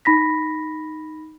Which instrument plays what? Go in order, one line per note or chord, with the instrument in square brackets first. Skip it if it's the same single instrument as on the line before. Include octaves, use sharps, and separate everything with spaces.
[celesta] D#4 B5 A#6 B6